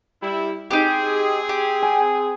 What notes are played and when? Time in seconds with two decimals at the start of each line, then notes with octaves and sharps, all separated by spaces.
0.22 G3 E4
0.71 C4 D#4 G4 G#4
1.49 G4
1.82 G#5